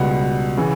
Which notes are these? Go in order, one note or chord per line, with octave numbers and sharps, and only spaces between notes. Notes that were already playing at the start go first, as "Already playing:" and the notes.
Already playing: C#2 B2 G3 F#5
C#3 E3